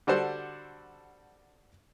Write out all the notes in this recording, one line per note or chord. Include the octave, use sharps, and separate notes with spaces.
D3 G3 F#4 A4 C5